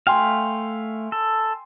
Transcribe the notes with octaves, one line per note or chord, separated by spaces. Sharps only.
A3 F5 G5 G#5 C6
A4